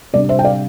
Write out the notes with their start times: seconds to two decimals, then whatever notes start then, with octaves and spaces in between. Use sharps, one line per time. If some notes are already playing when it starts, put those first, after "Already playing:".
0.13 C3 G3 D4 D5
0.29 C5 E5
0.39 G5
0.45 D5 F5